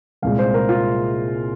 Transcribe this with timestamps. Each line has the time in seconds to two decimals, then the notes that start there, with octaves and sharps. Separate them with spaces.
0.22 C2 A#2 G#3 F5
0.39 C5
0.54 A#4
0.69 F4